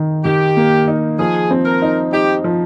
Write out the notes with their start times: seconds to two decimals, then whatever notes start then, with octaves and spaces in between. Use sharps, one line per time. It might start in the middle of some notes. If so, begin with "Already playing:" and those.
Already playing: D#3 D#4
0.25 D#3 G4
0.57 A#3
0.88 D#4
1.19 F3 G#4
1.51 C4
1.66 A#4
1.82 D#4
2.13 D#4 G4
2.44 F3